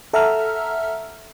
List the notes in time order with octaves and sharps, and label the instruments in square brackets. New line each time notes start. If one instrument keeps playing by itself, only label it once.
[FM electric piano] A4 E5 F#5 A#5 E6 F6